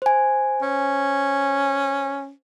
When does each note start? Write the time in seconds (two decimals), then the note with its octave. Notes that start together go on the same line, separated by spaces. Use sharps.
0.02 C5 G#5
0.62 C#4